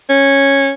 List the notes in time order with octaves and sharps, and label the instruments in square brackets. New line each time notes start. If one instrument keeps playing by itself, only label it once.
[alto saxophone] C#4